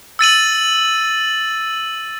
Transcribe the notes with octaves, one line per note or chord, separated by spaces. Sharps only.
E6 A6 D#7 F#7